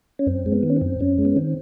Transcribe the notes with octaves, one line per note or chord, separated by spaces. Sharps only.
C#4
F#2 C4
G#3
B3
D#3
C#4
C4
F#2
F#2 C#4
G#3
B3
D#3 C4